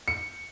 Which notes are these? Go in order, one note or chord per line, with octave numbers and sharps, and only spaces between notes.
C#7